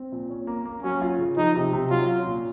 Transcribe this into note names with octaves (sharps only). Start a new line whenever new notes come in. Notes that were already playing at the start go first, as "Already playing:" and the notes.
Already playing: C4
A#2
C#4
A#3
A#3
F#3 C#4
F4
C#3
F3 D#4
C3
C3
F#3 F4
C#4
A#2